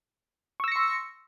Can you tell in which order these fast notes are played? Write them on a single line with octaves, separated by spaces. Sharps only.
C#6 E6 A#6 C#7 C6